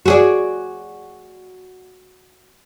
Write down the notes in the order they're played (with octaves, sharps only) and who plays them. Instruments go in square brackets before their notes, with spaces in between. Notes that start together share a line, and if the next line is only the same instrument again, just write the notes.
[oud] F#4 G#4 D5